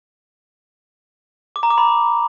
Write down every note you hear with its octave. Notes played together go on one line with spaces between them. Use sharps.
D6
A#5
D6
B5